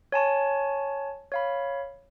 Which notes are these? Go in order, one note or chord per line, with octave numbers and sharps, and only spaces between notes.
C#5 G#5 A5 C#6
C#5 F5 B5